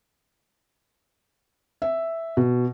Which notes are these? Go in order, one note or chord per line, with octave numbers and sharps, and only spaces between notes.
E5
B2